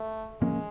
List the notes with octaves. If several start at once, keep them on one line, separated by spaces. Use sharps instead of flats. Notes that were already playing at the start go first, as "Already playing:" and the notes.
Already playing: A3
A2 F3 G#3 A#3 C#4